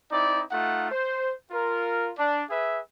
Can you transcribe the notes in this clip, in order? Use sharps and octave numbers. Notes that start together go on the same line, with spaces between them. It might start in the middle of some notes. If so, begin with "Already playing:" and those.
C4 D#4 E4 D5
A3 D#4 F4 F#5
C5
F4 A#4
D4
G#4 B4 E5